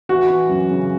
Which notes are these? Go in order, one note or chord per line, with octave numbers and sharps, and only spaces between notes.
E3 F#4
E3
F#2
C#3